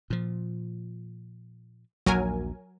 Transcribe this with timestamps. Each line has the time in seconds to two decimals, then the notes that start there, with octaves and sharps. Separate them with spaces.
0.10 A#2 F3
2.06 A#1 D#2 F#3 A#4 G#5